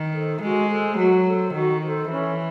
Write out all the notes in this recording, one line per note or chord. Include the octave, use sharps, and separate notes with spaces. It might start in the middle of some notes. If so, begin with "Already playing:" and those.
Already playing: D#3
A4 C5
G#3 F#4
A4 C5
F#3 F#4
A4 C5
D#3 F#4
A4 C5
E3 C#4